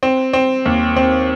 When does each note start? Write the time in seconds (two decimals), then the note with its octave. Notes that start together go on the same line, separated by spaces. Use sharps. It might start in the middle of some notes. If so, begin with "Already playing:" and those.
0.03 C4
0.33 C4
0.66 D#2
0.96 C4